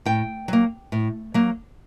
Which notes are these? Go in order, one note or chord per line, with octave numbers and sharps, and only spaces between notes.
A2 G5
F#3 A#3
A2
F#3 A#3